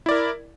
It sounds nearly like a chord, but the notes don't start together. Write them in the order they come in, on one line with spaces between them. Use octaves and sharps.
E4 D5 A#4